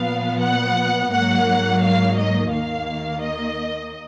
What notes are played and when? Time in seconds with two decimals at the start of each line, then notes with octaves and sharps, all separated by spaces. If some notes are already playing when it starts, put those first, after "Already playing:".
Already playing: A#2 F3 B3 F5
0.39 F#5
1.10 G#2 F#3 A#3 F#5
1.81 F5
2.16 D#5
2.51 D#2 D#3 A#3 F5
3.22 D#5